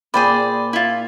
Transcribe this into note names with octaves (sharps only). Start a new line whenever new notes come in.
A#2 G#4 C5 D5 G5 B5
E4 F4